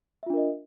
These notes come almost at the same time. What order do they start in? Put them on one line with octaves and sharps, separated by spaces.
E5 F4 D4 A#4 D#5